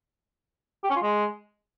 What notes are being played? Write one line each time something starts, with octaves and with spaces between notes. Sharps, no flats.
G4
C#4
F4
G#3